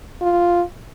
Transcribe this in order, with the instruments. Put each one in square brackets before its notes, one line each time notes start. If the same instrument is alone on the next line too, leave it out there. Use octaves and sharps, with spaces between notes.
[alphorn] F4